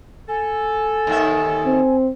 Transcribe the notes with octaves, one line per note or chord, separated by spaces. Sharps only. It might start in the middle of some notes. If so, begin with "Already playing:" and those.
A4 G#5
D#2 D#3 E5
C4